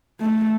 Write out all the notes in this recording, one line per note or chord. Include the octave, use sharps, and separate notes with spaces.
A3